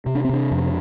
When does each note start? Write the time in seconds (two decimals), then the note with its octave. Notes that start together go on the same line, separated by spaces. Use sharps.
0.06 C3
0.15 D4
0.25 C4
0.29 C3 D4
0.51 F2